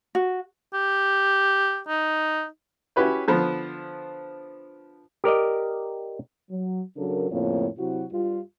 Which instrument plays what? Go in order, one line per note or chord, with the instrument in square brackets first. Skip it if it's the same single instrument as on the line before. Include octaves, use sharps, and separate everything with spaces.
[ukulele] F#4
[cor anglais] G4
D#4
[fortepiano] C#4 E4 F#4 G4 B4 C#5
D3 F3 B3
[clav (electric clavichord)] G4 A#4 D5 D#5
[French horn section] F#3
C#3 F#3 D4 A4 A#4
F2 A2 C#3 A#3 F4 C#5
C3 F#3 E4 F#4
G2 G3 F4